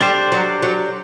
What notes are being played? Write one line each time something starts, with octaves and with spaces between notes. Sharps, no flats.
G3 D4 G4 C5
F#3
F#3